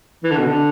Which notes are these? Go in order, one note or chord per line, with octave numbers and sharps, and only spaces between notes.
E3
D3
B2
D3